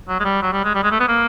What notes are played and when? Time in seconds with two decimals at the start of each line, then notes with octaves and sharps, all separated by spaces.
0.08 F#3
0.20 G#3
0.24 G3
0.42 F#3
0.52 G3
0.64 G#3
0.75 G3
0.83 G#3
0.91 A3
1.00 B3
1.08 A#3